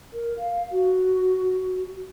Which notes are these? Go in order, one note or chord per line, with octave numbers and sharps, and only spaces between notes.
A#4
F5
F#4